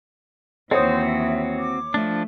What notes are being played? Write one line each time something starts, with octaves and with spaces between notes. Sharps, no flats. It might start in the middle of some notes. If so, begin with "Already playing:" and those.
D#2 E3 C4 F#4 C5 C#5 D#6
E5
D6
F3 A3 D4